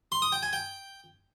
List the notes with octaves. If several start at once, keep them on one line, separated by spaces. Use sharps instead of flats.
C6
D#6
G5
G#5
G5